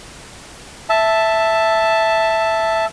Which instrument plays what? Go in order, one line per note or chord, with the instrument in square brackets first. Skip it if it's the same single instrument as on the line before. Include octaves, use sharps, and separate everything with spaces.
[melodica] E5 A5